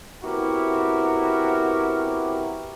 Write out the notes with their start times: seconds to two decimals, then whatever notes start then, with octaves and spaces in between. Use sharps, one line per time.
0.23 B3 C4 E4 F#4 G4 A#4